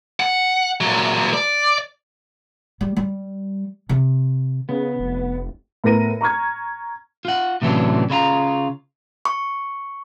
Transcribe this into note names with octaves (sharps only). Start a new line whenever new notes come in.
F#5
A#2 F#3
D5
G3
G3
C3
C#3 B3
F1
A2 B3 A#4 A#6 D#7
A#5 C#6 F6 G#6
F4 F#5
A2 C3 E3 F#3 C#4 D4
C#3 E4 F4 A#5
C#6